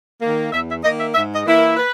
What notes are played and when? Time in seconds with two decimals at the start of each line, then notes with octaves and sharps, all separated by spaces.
0.22 D#3 A#3
0.52 E2 E5
0.68 E5
0.83 D#3 A#3 D#5
0.99 E5
1.14 G#2 E5
1.35 D#5
1.45 E3 A#3 E4
1.56 A#4
1.76 B4